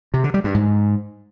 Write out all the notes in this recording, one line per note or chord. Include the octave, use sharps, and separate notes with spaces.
C3
D3
G3
G2
G#2